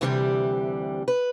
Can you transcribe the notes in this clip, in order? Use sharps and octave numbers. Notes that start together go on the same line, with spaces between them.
D2 C3 E3 G3 D4 G4
B4